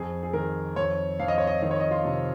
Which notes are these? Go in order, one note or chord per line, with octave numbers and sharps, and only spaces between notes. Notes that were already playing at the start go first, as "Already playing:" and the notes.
Already playing: F2 G#4
G#4
D#3 A#4
F2 C#5
F2 F5
D#5
C#5
D#5
D#3 D#5
C#5
D#5
F4
C3